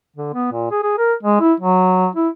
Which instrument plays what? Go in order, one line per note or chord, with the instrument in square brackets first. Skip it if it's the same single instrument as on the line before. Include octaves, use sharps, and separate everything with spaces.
[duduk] D3
B3
A#2
G#4
G#4
A#4
G#3
E4
F#3
E4